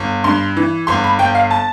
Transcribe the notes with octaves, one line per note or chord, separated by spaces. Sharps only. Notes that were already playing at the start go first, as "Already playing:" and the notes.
Already playing: G1
G2 C6
E3
G1 C6
B5
G1 G5
F5
A5